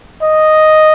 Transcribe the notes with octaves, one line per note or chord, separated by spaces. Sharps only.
D#5